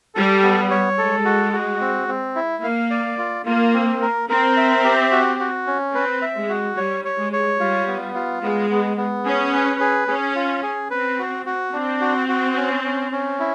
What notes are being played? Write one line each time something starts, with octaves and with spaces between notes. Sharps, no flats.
G3 A4
B3
C#5
G#3 A4
F#4
F#4
C4
C4
E4
A#3 F5
D5
F4
A#3 F4
C4
A#4
C4 A#4
E5
G4
F#4
F#4
C#4
C4 B4
E5
G#3
F#4
G3 C#5
C#5
G#3
C#5
G3 F4
B3
F4
G#3 B3
B3
B3
C#4 G#4
B4
G#4
C#4 G#4
F4
G#4
C4 B4
F#4
F#4
C4 D4
F#4
F#4
C#4
C#4
C#4
E4